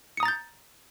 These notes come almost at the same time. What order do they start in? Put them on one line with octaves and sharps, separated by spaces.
C#7 D#6 A#5 A6 G6